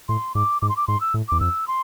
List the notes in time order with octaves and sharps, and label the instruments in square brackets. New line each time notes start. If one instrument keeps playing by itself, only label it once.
[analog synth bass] A2 [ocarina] C6
[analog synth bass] G#2 [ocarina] D6
[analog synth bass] G#2 [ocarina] D6
[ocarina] C6
D6
[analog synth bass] G#2 [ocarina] C6
[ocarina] E6
[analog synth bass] A2
[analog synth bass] E2 [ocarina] D6
[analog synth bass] F2 [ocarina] E6
[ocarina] C6